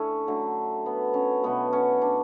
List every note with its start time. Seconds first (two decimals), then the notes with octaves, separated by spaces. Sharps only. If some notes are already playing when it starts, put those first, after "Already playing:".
Already playing: D3 A3 C#4 E4
0.28 D3 F#3 A3
0.86 B3
1.14 C#4
1.43 B2 F#3 A3 B3
1.73 C#4
2.02 D4